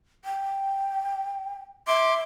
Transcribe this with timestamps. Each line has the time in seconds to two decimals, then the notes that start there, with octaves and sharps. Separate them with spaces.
0.25 G5
1.87 E5 C6 D6